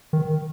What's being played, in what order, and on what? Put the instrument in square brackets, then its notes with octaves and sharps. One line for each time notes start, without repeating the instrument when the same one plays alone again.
[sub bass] D#3